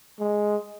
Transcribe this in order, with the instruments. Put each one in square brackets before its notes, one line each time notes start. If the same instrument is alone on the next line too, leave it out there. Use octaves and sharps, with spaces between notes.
[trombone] G#3